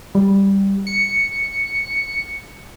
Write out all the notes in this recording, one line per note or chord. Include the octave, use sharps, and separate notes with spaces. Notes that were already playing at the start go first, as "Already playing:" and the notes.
G3
C#7